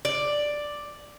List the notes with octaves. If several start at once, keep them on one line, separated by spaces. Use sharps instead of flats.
D5